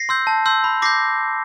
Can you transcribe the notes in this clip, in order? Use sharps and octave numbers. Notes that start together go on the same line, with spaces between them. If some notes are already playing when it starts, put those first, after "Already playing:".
Already playing: A#6 C7
C6 E6 G6
A5
C6 E6 G6
B5
D6 G6 A#6 C7